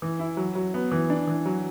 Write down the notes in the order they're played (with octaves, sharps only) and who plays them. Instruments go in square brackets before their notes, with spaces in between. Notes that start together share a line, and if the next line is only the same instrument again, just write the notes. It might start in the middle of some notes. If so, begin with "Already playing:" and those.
[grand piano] E3
E4
F#3
F#3
B3
E3
D4
E3
F#3